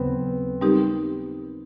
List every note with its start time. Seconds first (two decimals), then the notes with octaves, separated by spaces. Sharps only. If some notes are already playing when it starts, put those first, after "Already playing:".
Already playing: D#2 C#3 F#3 B3 C4
0.61 G3 B3 C4 D#4 G4 A#4